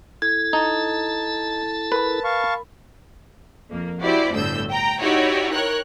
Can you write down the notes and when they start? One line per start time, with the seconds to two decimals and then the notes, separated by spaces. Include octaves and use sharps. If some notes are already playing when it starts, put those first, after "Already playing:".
0.22 E4 A4 G#6
0.53 D#4 A5
1.92 A#4 B4 B5
2.24 F5 A5 C#6
3.69 F2 A#3
4.01 E4 F#4 G4 C5 D5
4.32 G1 D2 A2 E6 G6
4.69 G5 A#5
5.01 D#4 E4 F#4 G4 C#5 D5
5.53 A#4 C#5 G5 F#6